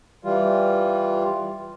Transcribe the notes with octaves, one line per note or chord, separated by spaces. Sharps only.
E3 G3 F4